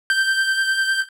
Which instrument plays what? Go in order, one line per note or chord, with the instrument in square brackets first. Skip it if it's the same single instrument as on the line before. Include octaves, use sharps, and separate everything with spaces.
[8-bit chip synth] G6